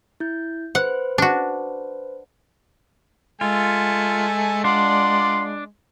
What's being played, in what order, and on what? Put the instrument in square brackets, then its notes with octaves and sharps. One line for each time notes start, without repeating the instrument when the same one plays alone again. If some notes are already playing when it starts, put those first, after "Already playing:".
[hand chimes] E4 G6
[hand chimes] B4 C5 [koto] F#5
[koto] D4 F#4
[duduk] G#3 [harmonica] A3 A4 G#5 [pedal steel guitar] F4
[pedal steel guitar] D4 [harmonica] F4 D5 F#5 [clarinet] C6